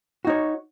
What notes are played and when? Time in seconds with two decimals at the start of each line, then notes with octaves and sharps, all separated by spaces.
0.25 F#4
0.27 D#4
0.30 C#5